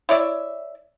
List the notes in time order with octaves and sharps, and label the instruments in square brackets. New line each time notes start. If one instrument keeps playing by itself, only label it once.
[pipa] E4 C#5 D5 E5